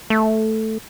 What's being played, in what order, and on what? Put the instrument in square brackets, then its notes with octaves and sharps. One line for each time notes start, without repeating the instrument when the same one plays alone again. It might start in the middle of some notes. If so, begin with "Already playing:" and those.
[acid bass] A3